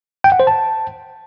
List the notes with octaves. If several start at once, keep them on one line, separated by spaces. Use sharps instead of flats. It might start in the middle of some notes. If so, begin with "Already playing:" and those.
G5
F#5
C5
A5